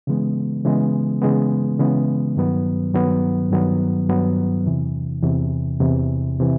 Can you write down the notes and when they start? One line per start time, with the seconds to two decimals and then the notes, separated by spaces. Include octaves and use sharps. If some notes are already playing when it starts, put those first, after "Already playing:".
0.07 C#3 E3 G#3 B3
0.65 C#3 E3 G#3 B3
1.22 C#3 E3 G#3 B3
1.79 C#3 E3 G#3 B3
2.37 G2 D#3 F#3 B3
2.94 G2 D#3 F#3 B3
3.51 G2 D#3 F#3 B3
4.09 G2 D#3 F#3 B3
4.66 E2 C3 E3
5.23 E2 C3 E3
5.80 E2 C3 E3
6.40 C3 E3